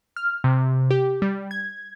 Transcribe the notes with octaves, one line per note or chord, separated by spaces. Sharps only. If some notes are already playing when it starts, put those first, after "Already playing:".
F6
C3
G4
G3
G#6